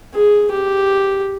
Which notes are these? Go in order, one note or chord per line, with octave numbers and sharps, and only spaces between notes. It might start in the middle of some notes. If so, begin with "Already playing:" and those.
G#4
G4